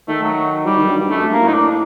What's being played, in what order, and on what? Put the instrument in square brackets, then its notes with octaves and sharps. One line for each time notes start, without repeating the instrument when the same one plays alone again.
[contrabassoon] D#3 [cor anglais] A3
[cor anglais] F#3
[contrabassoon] F#3 [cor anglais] G3
[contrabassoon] D#3
G2
G2
[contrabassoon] F#2 [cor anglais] A3
[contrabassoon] G2
[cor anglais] A#3
[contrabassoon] A2
[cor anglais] D#4
D4